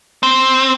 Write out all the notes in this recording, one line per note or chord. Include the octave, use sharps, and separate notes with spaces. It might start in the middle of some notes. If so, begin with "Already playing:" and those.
C4